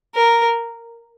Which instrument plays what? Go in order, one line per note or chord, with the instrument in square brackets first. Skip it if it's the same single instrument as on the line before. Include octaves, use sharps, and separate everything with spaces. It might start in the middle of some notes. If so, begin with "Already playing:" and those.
[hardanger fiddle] A#4